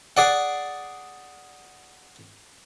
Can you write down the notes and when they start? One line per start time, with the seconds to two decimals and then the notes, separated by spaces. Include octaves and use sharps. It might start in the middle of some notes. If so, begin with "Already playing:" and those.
0.17 G#4 D5 F#5